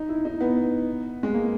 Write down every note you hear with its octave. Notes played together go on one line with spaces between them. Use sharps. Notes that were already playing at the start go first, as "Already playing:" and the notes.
Already playing: D#4
E4
D#4
B3
G#3
A#3